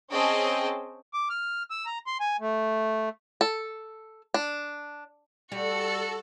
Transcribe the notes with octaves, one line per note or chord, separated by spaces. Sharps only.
C4 C#4 G#4 D#5 G5 A5
D6
F6
E6
A#5
C6
G#5
A3
A4
D4
G3 F#4 A4 C#7